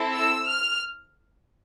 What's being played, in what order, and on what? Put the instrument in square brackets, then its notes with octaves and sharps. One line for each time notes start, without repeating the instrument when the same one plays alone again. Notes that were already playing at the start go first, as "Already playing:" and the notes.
Already playing: [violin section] C4 E4 A4
E6
F6